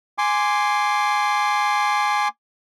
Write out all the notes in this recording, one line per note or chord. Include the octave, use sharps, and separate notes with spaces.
G#5 C6 D6